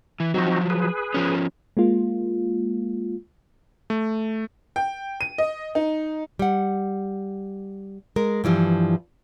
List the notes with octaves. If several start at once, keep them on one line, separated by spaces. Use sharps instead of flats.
E3
F3 F#3 C4 D#4 F#4
G#4 B4
F3 C#4
G#3 A#3 F4
A3
G5
D#7
D#5
D#4
G3 F#5
G#3 A#4
G2 E3 F3 G3